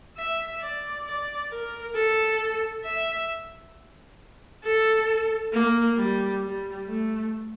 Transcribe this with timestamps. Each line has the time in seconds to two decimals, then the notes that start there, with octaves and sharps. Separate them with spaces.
0.17 E5
0.61 D5
1.06 D5
1.50 A#4
1.95 A4
2.84 E5
4.63 A4
5.53 A#3
5.97 G3
6.42 G3
6.87 A3